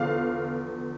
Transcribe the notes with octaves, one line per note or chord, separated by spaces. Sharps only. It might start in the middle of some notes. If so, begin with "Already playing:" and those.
Already playing: E2 D3 F3 F5